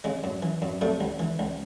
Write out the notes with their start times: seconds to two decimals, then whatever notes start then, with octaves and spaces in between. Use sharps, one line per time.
0.04 C#3 G#3
0.24 F#2
0.42 E3
0.62 F#2
0.81 C3 G3 A3
1.01 C#2
1.19 E3
1.39 C#2